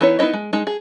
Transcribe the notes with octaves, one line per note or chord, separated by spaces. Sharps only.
E3 B3 D#4 E4 C#5
B3 D#4 E4 C#5 D#5
G#3
G#3 D#4
G#4